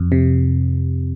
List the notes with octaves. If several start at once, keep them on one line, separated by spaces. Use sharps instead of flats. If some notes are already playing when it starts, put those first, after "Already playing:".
Already playing: F2
C3